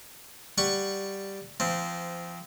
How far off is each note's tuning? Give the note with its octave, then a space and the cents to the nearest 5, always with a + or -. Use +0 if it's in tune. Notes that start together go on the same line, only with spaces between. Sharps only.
G3 +0 F#5 +0 C#6 +0
F3 -30 C4 -20